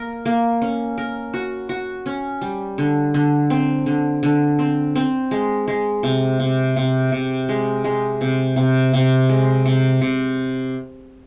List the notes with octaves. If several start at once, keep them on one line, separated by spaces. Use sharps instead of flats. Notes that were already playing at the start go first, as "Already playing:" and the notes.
Already playing: A#3 A#4
A#3
C#4
A#4
F#4
F#4
C#4
G3
D3
D3
C4
D3
D3
C4
C4
G#3
G#3
C3
C3
C3
C3
G#3
G#3
C3
C3
C3
G#3
C3
C3